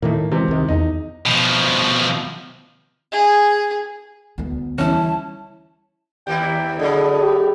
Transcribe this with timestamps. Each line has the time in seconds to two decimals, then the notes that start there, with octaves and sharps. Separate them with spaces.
0.02 A2 D#3 A3 A#3
0.31 C3 E3 G#3
0.48 C2 D#3
0.68 E2 D#4
1.26 B2 F3
3.12 G#4
4.38 D2 B3
4.78 E3 F3 G3 C#4 E4 A5
6.27 D#2 A#3 E4 G4 G5
6.79 A2 D3 F#3 G#4 A4 D#5 B5
7.21 G4